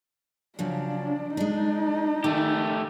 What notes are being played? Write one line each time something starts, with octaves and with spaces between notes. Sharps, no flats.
C#3 F3 F#3 D4
G#3 D4 D#4
D#3 A3 G4